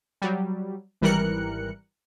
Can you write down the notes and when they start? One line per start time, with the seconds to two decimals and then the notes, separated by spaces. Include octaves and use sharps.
0.22 F#3 G3
1.01 G#1 E3 G3 A#4 F#6 C#7